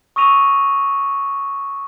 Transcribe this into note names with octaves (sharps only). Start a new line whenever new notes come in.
C#6 D#6 E6 A#6 D#7 F7